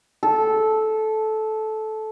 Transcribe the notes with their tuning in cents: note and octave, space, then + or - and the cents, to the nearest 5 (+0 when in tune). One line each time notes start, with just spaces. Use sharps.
A4 -15